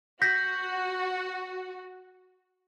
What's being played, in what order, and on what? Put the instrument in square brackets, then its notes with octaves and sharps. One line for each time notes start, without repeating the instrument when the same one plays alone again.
[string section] F#4 [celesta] G6 A#6 B6